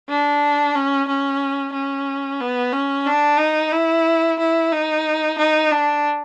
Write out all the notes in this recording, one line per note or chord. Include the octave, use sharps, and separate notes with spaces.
D4
C#4
C#4
C#4
B3
C#4
D4
D#4
E4
E4
D#4
D#4
D4